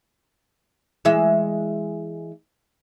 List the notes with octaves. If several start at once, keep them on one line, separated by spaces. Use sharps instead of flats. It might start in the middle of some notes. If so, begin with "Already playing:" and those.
E3 G#3 E5